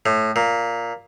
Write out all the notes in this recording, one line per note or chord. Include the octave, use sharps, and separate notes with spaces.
A2
A#2